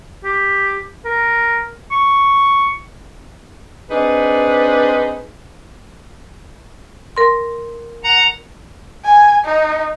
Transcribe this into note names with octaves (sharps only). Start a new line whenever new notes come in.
G4
A#4
C#6
C4 D4 D#4 G#4 B4
A#4 C6
F#5 A#5
G#5
D#4